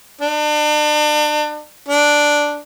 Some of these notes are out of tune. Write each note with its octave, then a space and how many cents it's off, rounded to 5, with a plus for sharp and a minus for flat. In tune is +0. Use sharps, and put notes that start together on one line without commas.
D4 +35
D4 +0